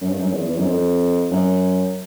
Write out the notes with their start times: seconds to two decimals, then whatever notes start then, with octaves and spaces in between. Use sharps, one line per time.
0.01 F#2
0.10 G2
0.19 F#2
0.33 E2
0.49 E2
0.58 F#2
0.66 F2
1.31 F#2